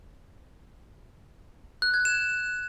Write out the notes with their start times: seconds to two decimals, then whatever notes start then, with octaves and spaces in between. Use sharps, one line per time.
1.82 F#6
1.94 G#6
2.05 E7